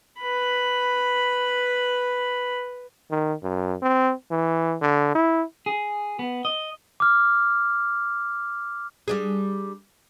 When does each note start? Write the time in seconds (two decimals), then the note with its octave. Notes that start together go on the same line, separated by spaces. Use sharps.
0.20 B4 B5
3.11 D#3
3.43 F#2
3.82 C4
4.31 E3
4.82 D3
5.15 E4
5.66 G#4
6.19 B3
6.45 D#5
7.00 D6 F6
9.08 G3 D4 G#4